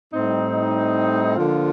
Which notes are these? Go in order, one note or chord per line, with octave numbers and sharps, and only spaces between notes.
A2 G3 C4 D#4
D3 F3 A#3 F4